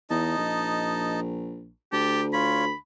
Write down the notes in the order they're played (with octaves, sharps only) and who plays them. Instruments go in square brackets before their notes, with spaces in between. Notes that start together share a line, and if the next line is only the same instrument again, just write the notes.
[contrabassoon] E2 [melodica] D#4 D#5 A5
[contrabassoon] A#1
[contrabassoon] D2 [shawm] G4 [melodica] A5
[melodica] F4 C#5 [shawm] B5